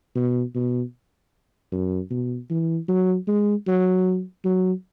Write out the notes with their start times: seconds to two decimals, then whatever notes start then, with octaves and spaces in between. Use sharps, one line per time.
0.15 B2
0.55 B2
1.72 F#2
2.10 B2
2.50 E3
2.88 F#3
3.28 G#3
3.68 F#3
4.45 F#3